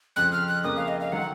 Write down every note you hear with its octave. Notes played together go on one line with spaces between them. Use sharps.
F2 C#3 F3 F#6
F6
F#6
F2 C#3 F3 A#3 D#6
F5
D#5
F5
D#3 F#3 F#5